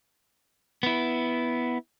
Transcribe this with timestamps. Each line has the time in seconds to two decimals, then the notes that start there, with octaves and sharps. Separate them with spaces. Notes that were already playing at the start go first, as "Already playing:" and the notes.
0.83 B3 E4